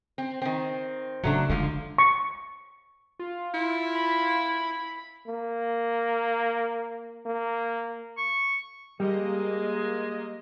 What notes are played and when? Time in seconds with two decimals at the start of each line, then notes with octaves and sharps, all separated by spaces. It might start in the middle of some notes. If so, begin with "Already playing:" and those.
0.18 C4
0.42 D#3 C4
1.24 C#3 F#3 A3 D4
1.49 D3 F3 G#3 F4
1.98 C#6
3.19 F4
3.54 E4
3.94 B5
5.27 A#3
7.26 A#3
8.18 C#6
9.00 G3 G#3 A#3 D#5